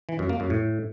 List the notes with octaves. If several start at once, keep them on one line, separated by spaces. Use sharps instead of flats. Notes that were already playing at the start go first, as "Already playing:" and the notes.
E3
F#2
A#3
F#2
A2